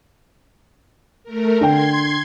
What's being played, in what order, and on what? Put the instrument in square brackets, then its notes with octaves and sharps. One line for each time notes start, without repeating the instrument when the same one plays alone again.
[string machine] A3 A#4
[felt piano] D3 G5 [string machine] C6 G#6